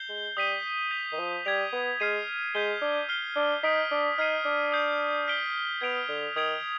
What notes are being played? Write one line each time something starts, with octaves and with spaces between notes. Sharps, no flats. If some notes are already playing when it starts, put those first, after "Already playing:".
Already playing: G6 C7 G7
G#3
G3 D#6 B6 D#7 G7
G6 B6 F7
D#3
F3
G3 G#6 B6 D7 F7
B3
G#3 F6 G#6 C7 D#7
G#3 G6 B6 D#7 G7
D4
F6 C7 G7
D4
D#4 D#6 B6 D7
D4
D#4 F6 G#6 C7 D#7
D4
D#6 G6 C7
F6 B6 D7 G7
B3 G#6 D7 F7
D3
D#3 D#6 G#6 D7 F7